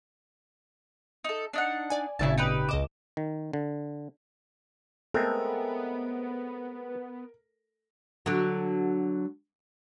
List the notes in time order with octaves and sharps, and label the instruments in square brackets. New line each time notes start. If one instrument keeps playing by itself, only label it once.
[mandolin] D#4 A4
D4 D#4 F#5
[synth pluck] D5 G#5
[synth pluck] G#1 A#2 C#3 [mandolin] E4 E5 A5
[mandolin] D#4 G4 B4
[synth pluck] C#2 D#5 E7 [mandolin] D6
[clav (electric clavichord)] D#3
D3
[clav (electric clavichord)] G#3 A3 C4 [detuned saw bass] B3 [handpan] A4 [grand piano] A#4
[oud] D3 F#3